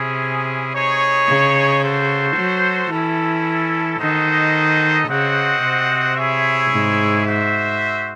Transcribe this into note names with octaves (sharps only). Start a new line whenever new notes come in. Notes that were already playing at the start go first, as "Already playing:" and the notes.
Already playing: C3 C#4 E4 G#4
D#4 G#4 C#5
C#3
F#4 A4 C5
F#3
E3 C#4 E4 A4
D#3 D#4 F#4 A4 C5 D#5
C#3 C4 F#4 C5 D#5 F#5
C3
E4 G#4 C#5 E5
G#2
F#4 C5 E5